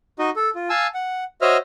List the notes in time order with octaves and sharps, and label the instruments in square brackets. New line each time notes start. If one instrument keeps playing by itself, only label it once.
[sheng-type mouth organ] D#4 F#4 D#5
A4
F4
F5 G#5 A5 E6
F#5
F#4 C5 C#5 D#5 E5 F6